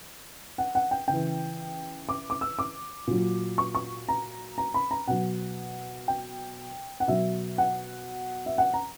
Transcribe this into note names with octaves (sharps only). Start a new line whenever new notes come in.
F#5
F#5
G5
C#3 G5
E3
D6
D6
E6
D6
A#2 F#3
C#6
C#6
A#5
A#5
B5
A#5
B2 F#3 F#5
G5
F#5
B2 F#3 E5
F#5
E5
F#5
A#5